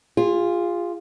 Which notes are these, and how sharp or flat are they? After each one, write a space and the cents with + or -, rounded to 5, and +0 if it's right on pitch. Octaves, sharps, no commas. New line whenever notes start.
F4 +0 G#4 -35